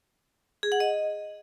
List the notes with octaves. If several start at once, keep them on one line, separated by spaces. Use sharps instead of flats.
G#4
F#5
D#5